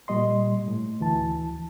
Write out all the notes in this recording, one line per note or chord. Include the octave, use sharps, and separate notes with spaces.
A#2 G3 D#5 C6
A2
D2 E3 A5